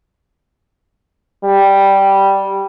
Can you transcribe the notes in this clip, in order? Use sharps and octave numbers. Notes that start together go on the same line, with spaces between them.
G3